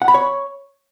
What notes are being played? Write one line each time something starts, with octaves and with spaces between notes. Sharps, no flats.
F#5
B5
C#5